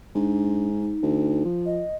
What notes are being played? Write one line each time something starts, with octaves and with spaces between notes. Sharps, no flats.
G#2 D4
D#4
D2
F3
D#5